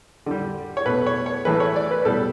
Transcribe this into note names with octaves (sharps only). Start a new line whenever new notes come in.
D3 G3
C#5
B2 A3 B4
C#5
C#5
A2 E3 A3 B4
C#5
D5
B4
B2 G3 A4